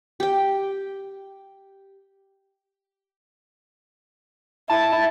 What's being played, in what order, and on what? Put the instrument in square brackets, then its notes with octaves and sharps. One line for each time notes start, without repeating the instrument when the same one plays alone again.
[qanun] G4 G5
[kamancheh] E4 [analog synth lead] A5